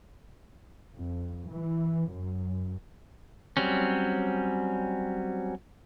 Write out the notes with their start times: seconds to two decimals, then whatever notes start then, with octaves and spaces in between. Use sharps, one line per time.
0.95 F2
1.51 E3
2.10 F#2
3.57 F#3 G3 C4 C#4